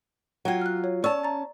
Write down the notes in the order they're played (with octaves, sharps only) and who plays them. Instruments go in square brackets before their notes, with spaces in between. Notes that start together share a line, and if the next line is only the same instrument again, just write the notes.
[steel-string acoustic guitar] F#3 F4 [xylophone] F#5 G5 G#6
[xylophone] F6 F#6
C#5
[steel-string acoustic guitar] C#4 A5 [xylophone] D5 C#6 E6
[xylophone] A#5 A6